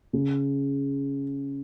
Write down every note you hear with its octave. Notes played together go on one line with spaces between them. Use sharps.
C#3